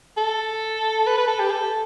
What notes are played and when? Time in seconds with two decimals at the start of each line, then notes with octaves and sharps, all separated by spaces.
0.17 A4
1.07 B4
1.18 B4
1.28 A4
1.40 G4
1.51 A4